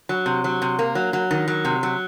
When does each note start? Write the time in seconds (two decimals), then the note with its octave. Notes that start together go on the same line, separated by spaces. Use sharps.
0.09 F#3
0.26 C3
0.44 F#3
0.62 C3
0.79 A#3
0.95 F#3
1.13 F#3
1.31 D#3
1.48 F#3
1.65 C3
1.83 F#3